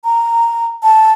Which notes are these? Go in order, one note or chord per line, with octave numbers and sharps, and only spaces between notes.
A#5
A5